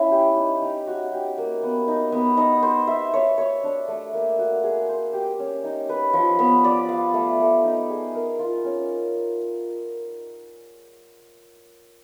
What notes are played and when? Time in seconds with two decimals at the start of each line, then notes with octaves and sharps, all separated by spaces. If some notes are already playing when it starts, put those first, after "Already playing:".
Already playing: C#4 E4
0.11 G4
0.37 D#4
0.62 D#4
0.87 F#4
1.13 G4
1.38 A#3
1.63 B3
1.88 D#4
2.12 B3
2.37 D#4
2.63 C5
2.87 E5
3.14 C#5
3.38 C#5
3.63 D4
3.88 A3
4.13 A#3
4.39 F#4
4.64 G#4
4.89 C5
5.13 G4
5.39 C#4
5.64 D#4
5.89 B4
6.13 F3
6.39 B3
6.64 D5
6.89 F5
7.14 A3
7.40 A3
7.64 D#4
7.90 G#4
8.15 A#4
8.39 F4
8.65 C#4